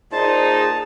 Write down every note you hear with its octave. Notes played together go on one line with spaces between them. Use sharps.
A#2 D#4 G#4 C5 A5